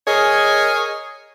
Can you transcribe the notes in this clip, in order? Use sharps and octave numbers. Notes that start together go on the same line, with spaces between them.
G#4 A#4 C#5 D#5